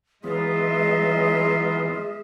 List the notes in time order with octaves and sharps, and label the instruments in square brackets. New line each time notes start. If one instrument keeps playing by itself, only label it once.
[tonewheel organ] E3 B3 [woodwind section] F#3 F4 [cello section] G#3 D#5 E5 [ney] G#4